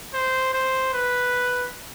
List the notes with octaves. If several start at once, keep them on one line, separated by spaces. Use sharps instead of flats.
C5
C5
B4